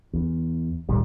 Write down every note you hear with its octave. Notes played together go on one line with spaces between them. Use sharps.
E2
D2 A#2 D#3 G3